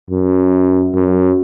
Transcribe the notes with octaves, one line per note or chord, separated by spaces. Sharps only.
F#2
F#2